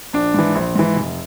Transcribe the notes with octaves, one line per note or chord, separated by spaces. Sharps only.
A#1 D4
G#2 E3
A#1
G#2 E3
F1